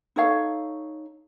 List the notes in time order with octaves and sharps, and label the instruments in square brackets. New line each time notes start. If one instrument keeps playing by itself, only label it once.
[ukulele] D#4 A4 C#5 F5